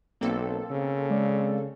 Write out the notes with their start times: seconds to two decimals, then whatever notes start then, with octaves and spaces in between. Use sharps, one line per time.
0.21 B1 A#3 C4 A4
0.70 C#3
1.10 G#3 D5